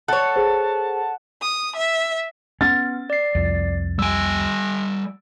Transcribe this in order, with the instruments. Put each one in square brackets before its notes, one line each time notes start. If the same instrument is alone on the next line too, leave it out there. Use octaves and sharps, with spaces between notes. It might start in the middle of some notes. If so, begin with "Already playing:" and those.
[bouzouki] A4 C#5 [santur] F#5 [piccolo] A5
[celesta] G#4 C5
[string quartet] D#6
E5
[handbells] B3 [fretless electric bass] C#4 [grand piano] A6
[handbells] D5 C7
[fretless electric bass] C2 F2
[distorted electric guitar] G3 G#5 [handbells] E6 D7